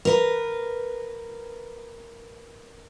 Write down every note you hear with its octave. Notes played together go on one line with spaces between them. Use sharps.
A#4 B4